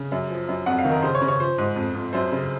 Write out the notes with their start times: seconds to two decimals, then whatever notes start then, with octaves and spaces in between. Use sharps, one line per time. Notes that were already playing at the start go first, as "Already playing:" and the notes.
Already playing: C#3
0.12 F#2
0.30 F3
0.49 F#2
0.66 F2 F#5
0.78 F5
0.85 D#3
0.91 A#4
1.02 C#3 C5
1.15 C#5
1.22 C#3
1.28 C#5
1.40 F3 C5
1.58 G#2
1.76 F2
1.95 F2
2.13 F#2 C5
2.32 C#3